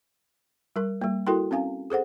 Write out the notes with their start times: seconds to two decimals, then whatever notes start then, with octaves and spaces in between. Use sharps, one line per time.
0.76 G3 A#4
1.02 G3 A#3
1.27 E4 F#4 A4 A#4 G5 C6
1.51 C4 C#4 F5 G#5
1.90 G#4 A4 C5 F#5